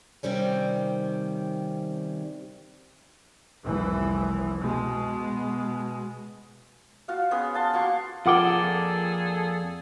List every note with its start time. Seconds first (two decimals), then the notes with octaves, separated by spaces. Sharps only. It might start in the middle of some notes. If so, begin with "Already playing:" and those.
0.23 C3 D#3 G3 C4 C#4
3.64 F1 C2 E3
4.60 B2 G#3
7.08 F4 F#4 F5
7.31 G#3 B3 C#4 D#6
7.54 F#5 A5 C6
7.73 A#3 F4 F#4 C#6
8.26 F2 A#2 F4 G#4 A4 F#5 G5 D6